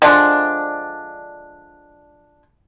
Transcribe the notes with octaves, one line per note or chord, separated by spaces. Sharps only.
D3 F3 G#3 D4